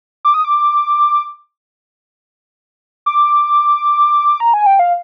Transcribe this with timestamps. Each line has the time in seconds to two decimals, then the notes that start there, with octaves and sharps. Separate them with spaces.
0.25 D6
0.34 D#6
0.45 D6
3.06 D6
4.40 A#5
4.54 G#5
4.66 G5
4.79 F5